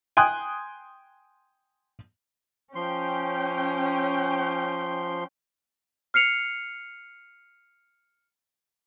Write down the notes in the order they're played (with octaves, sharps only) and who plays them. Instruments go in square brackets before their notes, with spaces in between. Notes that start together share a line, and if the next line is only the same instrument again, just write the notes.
[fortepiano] G5 G#5 C6 D#6 F#6
[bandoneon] F3 C6 [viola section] C#4 G5
[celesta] F6 C7 C#7 F7